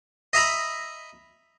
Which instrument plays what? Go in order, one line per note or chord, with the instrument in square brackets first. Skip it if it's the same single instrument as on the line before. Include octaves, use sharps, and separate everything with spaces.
[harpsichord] D#5 E5 A#5 B5